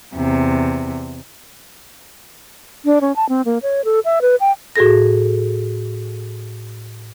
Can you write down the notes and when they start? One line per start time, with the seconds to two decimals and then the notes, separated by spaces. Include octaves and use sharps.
0.15 E2 C3
2.85 D4
3.01 C#4
3.16 A5
3.29 C4
3.45 A#3
3.62 C#5
3.85 A4
4.05 E5
4.22 B4
4.40 G5
4.76 A2 F#4 G#4 A4 A#6